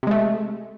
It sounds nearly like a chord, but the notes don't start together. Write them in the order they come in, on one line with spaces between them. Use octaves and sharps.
C3 G#3 A3